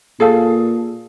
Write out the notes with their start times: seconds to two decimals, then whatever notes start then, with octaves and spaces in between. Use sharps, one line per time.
0.20 A#2 G#4 A4 F5